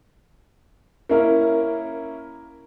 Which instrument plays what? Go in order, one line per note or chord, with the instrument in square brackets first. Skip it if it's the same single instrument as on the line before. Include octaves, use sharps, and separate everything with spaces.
[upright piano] A#3 C#4 E4 A#4